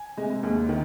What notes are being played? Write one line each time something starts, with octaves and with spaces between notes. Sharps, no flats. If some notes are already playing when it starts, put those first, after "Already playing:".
Already playing: G#5
C3 G#3
D#2
D#3